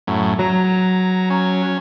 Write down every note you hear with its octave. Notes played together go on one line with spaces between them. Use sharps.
F#2 A2
F#3 A#5
C#4